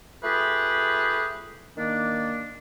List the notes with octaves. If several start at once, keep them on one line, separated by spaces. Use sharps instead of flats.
A3 F4 G4 G#4 B4
D#3 A#3 D4